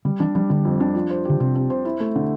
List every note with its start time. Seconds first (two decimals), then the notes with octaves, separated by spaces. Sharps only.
0.05 D3 G3
0.20 E3 D4
0.35 F3 G3
0.50 D3 G3
0.65 F2
0.80 D4
0.95 F3
1.10 C5
1.25 D3 G4
1.40 C3 C4
1.55 C4
1.70 C5
1.85 E4
2.00 A3
2.15 D3